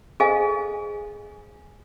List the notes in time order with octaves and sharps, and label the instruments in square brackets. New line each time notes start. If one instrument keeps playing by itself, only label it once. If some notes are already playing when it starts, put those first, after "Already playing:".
[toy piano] G#4 A4 C5 D#5 F5 G#5